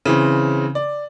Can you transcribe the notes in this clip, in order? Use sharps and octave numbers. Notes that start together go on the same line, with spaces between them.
C#3 E3 C4
D5